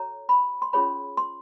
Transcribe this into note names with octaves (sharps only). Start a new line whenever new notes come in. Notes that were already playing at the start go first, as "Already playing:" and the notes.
Already playing: F#4 A4 C#5 A#5
B5
C6
C#4 F4 G#4 C#5 B5
C6